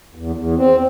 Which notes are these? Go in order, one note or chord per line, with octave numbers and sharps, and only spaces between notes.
E2
E2
C4